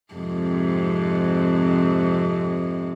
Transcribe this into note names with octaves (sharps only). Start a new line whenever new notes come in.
F2 G#2 C3